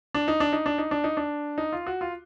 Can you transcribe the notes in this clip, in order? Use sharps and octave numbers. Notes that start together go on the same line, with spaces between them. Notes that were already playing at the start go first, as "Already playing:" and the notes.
D4
D#4
D4
D#4
D4
D#4
D4
D#4
D4
D#4
F4
F#4
F4